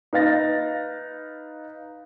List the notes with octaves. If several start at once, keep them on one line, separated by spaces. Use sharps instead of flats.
D#4 B4 F5 A6 A#6